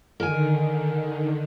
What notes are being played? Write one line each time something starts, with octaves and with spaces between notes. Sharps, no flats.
D3 D#3 A#4 G#5